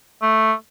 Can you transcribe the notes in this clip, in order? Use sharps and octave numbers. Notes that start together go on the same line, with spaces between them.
A3